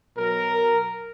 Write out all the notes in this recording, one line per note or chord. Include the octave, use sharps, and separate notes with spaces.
B2 F#3 A#4